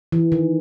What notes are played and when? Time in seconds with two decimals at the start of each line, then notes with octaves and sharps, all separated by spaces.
0.12 E3
0.32 D#3